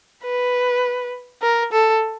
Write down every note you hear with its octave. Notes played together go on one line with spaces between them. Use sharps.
B4
A#4
A4